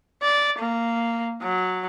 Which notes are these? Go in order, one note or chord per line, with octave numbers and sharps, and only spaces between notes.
D5
A#3
F#3